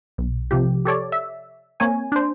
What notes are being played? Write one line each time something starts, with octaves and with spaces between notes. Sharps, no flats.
B1
C3 F3 G4
G4 A4 C#5 D5
E5
A#3 C4 C#5 G#5
D4 C5